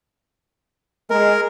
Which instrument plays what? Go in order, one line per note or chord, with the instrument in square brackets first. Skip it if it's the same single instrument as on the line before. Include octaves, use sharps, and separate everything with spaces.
[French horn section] G#3 [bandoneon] A#4